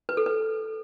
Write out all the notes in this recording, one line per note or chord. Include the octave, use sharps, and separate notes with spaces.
B4
A4
B4